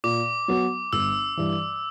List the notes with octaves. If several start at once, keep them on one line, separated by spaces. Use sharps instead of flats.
A#2 D6
F#3 B3 F#4
G1 E6
G2 E3